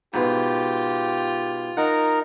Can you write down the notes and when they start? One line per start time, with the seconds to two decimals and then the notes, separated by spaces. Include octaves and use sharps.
0.14 G#2 B2 F4 G4
1.77 D#4 A#4 F#5